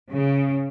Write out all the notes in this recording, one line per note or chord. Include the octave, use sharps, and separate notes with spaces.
C#3